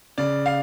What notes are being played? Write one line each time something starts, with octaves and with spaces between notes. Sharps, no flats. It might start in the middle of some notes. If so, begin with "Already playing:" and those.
C#3 D5
F5